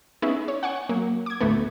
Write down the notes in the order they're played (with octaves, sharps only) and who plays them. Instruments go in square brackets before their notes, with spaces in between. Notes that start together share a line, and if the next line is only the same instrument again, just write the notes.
[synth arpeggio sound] B3 C#4 D#4 E4 G#4
C#5
F#5 G#5 C#6
F#3 A#3
D6 G#6
D2 A2 A3 B3